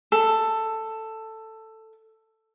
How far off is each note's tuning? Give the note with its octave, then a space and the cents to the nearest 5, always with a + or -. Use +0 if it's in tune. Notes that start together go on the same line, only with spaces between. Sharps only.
A4 +10